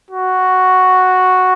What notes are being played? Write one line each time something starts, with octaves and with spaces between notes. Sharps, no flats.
F#4